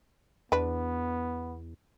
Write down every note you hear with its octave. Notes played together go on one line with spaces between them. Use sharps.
E2 B3 D4 B4